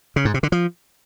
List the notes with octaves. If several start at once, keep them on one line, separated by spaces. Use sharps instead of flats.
C#3
G#2
C3
D3
F3